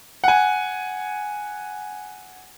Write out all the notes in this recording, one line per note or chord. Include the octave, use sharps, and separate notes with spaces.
F#5 G#5